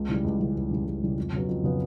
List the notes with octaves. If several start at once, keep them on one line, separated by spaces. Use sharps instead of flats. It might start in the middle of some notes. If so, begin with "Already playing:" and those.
Already playing: C#2
C#3 E3 G3
C#2
C#3 E3 G3
C#2
C#3 E3 G3
C#2
C#3 E3 G3
F2
C#3 F#3 B3
F2
C#3 F#3 B3